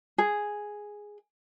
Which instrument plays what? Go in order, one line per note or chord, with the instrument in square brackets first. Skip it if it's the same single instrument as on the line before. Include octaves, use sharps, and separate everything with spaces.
[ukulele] G#4